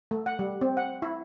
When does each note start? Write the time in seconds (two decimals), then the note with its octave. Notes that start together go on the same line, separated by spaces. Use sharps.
0.11 A3
0.26 F#5
0.39 G3
0.61 C4
0.77 F#5
1.02 E4